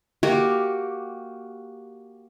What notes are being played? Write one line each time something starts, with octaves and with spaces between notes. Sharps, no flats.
A#3 F#4 G4